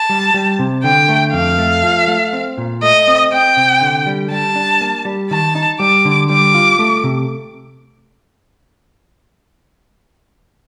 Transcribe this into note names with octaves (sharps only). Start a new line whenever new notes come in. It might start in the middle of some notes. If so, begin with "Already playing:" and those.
Already playing: A5
G3
G3
C3
D3 G5
A3
F2 F5
A3
F3
A3
C4
A#2
A3 D#5
C4
C4 G5
C3
D3
G3
G3 A5
D4
A#3
G3
D#3 A5
D#4
G3 D6
D3
G3 D6
F4
A3
C3